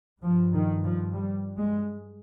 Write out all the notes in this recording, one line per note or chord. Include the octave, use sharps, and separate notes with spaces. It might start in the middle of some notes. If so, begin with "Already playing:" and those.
G2 F3
D#3
F3
G3
G#3